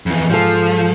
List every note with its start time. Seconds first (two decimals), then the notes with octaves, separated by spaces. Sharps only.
0.06 F2 E3
0.30 G#2 F3 A4